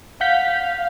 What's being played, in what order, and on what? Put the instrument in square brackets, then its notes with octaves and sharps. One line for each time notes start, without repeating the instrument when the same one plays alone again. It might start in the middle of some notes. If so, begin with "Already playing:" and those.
[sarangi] F5 [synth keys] F#5 G6 B6